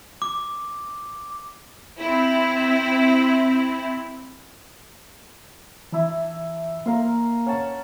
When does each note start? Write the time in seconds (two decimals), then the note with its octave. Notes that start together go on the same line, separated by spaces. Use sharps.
0.22 D6
2.00 C4 E4
5.92 E3 D4 E4 E5
6.86 A#3 A#4 F5 C6
7.46 C#4 F#5 A5